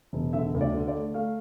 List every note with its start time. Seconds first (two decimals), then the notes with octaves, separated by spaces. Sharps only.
0.13 E1
0.33 D3 E5
0.54 D2
0.61 D5
0.74 D3
0.88 D5
0.95 A3
1.14 A3 F5